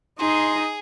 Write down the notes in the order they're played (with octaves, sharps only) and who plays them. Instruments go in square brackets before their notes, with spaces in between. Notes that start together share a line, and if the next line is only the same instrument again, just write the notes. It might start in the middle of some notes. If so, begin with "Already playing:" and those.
[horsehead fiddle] D#4 D#5 [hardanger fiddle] G#4 [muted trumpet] C6